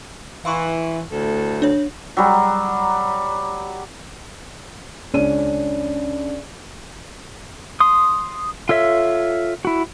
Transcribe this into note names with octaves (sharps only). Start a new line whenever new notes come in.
E3 F5 C6 C#6
D2 A2 A4
D4 C#5
F#3 G3
C#2 C#4 D4 D#7
C6 D#6
F4 A4 C#5 E5
E4 F#4